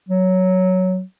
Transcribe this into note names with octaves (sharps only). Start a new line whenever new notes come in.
F#3